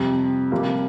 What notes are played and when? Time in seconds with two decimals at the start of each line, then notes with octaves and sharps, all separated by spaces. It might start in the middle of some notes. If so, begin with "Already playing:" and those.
Already playing: F2 C3 G3
0.52 F1 F2 C3 G3 A#3